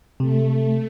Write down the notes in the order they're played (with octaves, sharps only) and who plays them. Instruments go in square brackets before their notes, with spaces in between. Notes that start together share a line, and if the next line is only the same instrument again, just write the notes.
[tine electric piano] C3 [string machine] A3